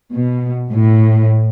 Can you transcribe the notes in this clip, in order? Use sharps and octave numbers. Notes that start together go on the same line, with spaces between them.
B2
A2